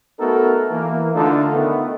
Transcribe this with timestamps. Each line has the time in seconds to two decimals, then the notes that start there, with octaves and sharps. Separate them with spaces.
0.20 A3 B3 D#4 F#4 A4 A#4
0.71 E3 A#3
1.15 D3 A3 D4 D#4 F4 A4
1.55 D#3 A3 B3